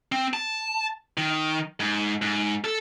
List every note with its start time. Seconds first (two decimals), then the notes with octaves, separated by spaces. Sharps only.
0.12 C4
0.34 A5
1.18 D#3
1.80 G#2
2.22 G#2
2.64 A4